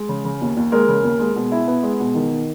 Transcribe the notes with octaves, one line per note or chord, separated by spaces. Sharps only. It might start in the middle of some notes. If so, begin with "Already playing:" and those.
Already playing: G#3
C#3
C#3
D#2
D#2
G#3 A#4
C#3
D#2
G#3
B2
E4
B3
G#3
B2
D#3